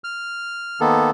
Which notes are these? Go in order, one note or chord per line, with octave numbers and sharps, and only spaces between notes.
F6
D#3 A#3 B3 A4